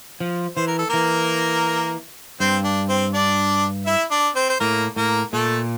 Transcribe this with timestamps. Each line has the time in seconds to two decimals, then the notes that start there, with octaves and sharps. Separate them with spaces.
0.20 F3
0.57 E3 C5
0.68 A#4
0.79 A4
0.90 E3 A#3 A#4
2.40 G2 C4 C5
2.64 D4
2.88 C4 C5
3.13 D4 D5
3.86 E4 E5
4.11 D4 D5
4.35 C4 C5
4.50 C5
4.60 A2 A#3 A#4
4.96 A2 A#3 A#4
5.33 A#2 A3 A4